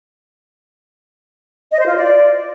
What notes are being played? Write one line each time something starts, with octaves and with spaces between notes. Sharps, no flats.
D#5
C5
F4
D5